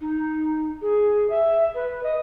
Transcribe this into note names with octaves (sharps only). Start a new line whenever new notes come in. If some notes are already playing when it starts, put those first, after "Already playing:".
D#4
G#4
E5
B4
D#5